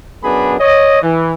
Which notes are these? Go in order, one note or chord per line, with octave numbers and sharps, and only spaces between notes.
F#2 B3 D4 G#4 B5
C#5 D#5
E3